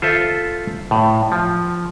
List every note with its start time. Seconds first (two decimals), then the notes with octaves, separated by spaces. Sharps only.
0.02 F4 A4 C5 E5
0.91 A2
1.32 F3